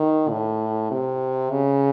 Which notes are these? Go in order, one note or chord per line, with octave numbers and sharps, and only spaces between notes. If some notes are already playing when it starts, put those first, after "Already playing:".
Already playing: D#3
A2
C3
C#3